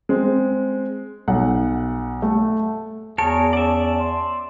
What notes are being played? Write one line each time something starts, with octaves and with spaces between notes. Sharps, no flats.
G#3 C4
B1 F#5
A3
E2 F#4 G#4 A#4 C#5 A5
C#4 D5 E5
C6